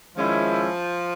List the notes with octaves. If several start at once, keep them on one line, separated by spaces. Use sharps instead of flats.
D#3 F3 G#3 C#4 E4